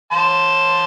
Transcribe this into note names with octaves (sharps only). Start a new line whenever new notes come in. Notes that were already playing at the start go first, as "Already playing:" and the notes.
A5 C6